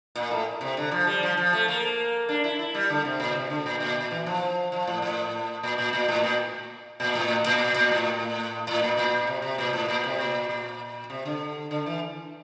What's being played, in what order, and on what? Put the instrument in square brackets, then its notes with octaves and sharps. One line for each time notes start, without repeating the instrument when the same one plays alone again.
[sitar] A#2
A2
C3
D3
F3
G3
F3
F3
A3
A#3
D4
E4
E4
G3
D3
C3
A#2
C3
D3
A#2
A#2
E3
F3
F3
A2
A2
A#2
A#2
A#2
A2
A#2
A#2
A2
A#2
A#2
A2
A2
A#2
A#2
C3
C3
A#2
A2
A#2
C3
A#2
A#2
C3
D3
D3
E3